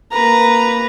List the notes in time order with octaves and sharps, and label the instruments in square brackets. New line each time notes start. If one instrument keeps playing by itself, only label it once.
[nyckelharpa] A#3 A#5 [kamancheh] B4